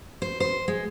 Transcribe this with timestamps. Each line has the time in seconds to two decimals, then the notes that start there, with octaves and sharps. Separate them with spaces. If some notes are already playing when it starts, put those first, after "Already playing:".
0.22 C5
0.40 C5
0.68 G#3